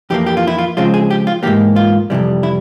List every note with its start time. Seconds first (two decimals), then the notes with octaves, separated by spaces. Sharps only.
0.10 F2 E3 A#3 G4
0.26 G4
0.37 F4
0.47 E4
0.58 F4
0.77 C#3 F3 G#3 C4 F4
0.94 G#4
1.10 G4
1.27 F4
1.43 G#2 E3 A#3 G4
1.76 F4
2.10 F2 C3 E3 G3
2.43 E4